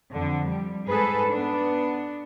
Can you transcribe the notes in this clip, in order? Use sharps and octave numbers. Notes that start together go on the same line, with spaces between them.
F2 D3
G3
G#2 G#4 A4 B4
B3 D4